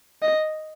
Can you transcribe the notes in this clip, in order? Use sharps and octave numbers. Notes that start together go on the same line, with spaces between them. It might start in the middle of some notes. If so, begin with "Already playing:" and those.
D#5